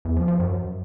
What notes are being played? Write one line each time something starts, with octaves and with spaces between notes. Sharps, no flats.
E2
F3
F3
F#2